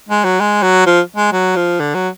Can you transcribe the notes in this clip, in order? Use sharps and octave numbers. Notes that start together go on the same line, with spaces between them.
G#3
F#3
G#3
F#3
F3
G#3
F#3
F3
D3
F#3